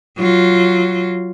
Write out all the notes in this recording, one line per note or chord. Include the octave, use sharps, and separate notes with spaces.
F#3 F4